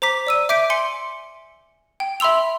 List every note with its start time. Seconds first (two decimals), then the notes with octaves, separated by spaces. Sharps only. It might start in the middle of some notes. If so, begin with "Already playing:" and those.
0.02 C5 A#5 D6 B6
0.27 D5 E6 D#7
0.49 E5 D6 G6 B6 D7
0.70 G#5 C6 C#7
2.00 G5
2.20 E5 B5 C6 E6 F7